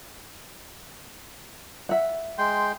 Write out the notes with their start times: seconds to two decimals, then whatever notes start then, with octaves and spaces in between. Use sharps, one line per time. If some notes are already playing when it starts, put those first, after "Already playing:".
1.89 E5 F#5
2.38 G#3 G5 C6